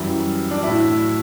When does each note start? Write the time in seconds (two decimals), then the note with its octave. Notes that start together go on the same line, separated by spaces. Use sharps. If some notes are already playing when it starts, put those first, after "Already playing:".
Already playing: F#2 E3 G3 E4
0.51 D4
0.63 A2 F#3 E4